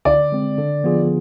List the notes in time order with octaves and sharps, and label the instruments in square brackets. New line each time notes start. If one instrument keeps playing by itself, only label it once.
[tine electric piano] D3 [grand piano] D5
[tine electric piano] G#3 C4
D3
F3 B3 F4 G#4